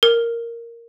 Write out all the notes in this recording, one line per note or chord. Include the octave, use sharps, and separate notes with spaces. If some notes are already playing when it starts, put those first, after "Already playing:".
A#4